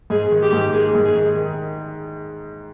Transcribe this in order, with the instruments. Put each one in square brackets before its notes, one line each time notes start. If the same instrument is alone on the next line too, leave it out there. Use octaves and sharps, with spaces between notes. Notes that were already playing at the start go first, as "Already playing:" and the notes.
[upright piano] G#2 [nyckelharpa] G#4
[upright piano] D#3
[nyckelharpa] G4
[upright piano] G#2
[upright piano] A#3 [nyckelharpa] G#4
[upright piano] G#2
[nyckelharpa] G#4
[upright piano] D#3
D#3